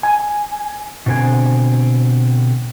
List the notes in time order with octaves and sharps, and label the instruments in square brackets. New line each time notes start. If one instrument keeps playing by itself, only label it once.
[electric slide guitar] G#5
B2 D3 C4 A4 G#5